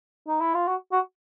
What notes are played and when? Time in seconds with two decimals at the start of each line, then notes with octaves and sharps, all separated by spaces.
0.28 D#4
0.41 E4
0.54 F4
0.68 F#4
0.92 F#4